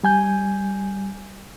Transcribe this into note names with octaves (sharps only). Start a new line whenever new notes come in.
G3 G#5 G6